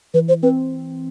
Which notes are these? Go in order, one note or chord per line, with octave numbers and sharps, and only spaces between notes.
E3 B4
C5
C4 B4